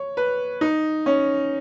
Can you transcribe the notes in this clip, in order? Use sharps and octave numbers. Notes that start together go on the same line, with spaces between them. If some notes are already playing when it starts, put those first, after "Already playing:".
Already playing: C#5
B4
D#4
C#4